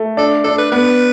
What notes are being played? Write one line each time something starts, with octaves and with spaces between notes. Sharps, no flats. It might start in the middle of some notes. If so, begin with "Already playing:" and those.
Already playing: A3
D4 A4
D4 A4
B4
B3 B4